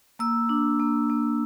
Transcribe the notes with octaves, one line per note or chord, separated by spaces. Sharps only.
A#3 E6
D4
A#3
A#3